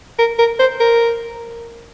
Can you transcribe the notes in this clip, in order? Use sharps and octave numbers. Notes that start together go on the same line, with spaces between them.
A#4
A#4
C5
A#4